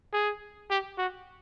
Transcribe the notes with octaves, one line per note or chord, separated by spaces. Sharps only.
G#4
G4
F#4